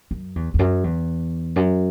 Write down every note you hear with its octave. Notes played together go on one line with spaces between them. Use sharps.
F#2
E2
E2
F#2
E2
F#2